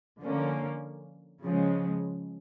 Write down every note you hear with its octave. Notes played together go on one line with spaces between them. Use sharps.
D3 F3 A#3 C#4
C#3 F3 G#3